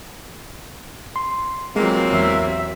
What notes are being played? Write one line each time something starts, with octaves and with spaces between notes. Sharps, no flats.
C6
C3 E3 F#3 G#3 A#3 C4 F4
E2 E5